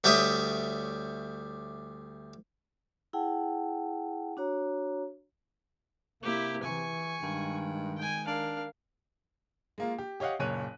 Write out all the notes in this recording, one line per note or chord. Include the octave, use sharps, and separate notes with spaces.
D2 G3 G4 C#5 E5 D#6
E4 G#4 F#5 G5 A5
D4 F#4 C#5 A#5
C3 A#3 E4 G4
E3 G#5 C#6
G2 D#3 G#3
G5 G#5
D4 A#4 F5
G#3 A#3 F4
G4
G4 C#5 D#5 F5 F#5
F#1 A#2 C#5 F#6 D#7